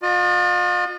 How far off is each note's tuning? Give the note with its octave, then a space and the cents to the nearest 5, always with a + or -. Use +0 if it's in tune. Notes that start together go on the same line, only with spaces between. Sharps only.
F4 +40 D#5 -35